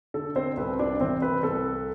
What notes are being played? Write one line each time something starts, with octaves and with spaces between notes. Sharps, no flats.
D3 A4
C4 C5
C2 B4
D4 D5
C3 E3 C4 C5
B4
C2 A4